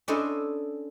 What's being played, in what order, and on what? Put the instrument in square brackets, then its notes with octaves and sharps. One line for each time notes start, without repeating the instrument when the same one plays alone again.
[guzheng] C#4 D4 E4 A4 C5 D#5